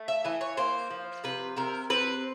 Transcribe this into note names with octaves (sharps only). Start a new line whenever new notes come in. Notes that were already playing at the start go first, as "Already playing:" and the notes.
Already playing: A3
E5
E3 D#5
C#5
A#3 C5
F3
C3 B4
C3 A#4
C4 B4